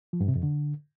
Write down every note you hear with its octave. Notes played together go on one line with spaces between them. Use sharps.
F3
G2
C3
F2
D3